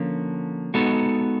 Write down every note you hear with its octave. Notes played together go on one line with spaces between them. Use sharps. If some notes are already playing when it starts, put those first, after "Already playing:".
Already playing: D3 F3 A#3 C#4
G#3 B3 D#4 F#4 A4